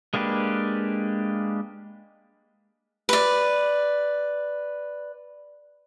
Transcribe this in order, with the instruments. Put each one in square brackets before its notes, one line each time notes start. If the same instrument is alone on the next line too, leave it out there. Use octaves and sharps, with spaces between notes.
[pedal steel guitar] G#3 A#3 D4 G4 B4
[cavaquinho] B4 D5